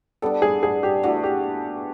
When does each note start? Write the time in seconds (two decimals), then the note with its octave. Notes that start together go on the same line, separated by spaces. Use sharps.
0.22 G3 B3 D4 A4
0.42 G#4
0.63 G#4
0.83 G4
1.03 E3 A3 D4 F#4
1.24 G4